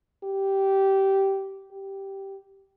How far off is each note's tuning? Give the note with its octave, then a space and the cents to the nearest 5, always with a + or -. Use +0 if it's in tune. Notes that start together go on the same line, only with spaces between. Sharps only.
G4 -15
G4 -5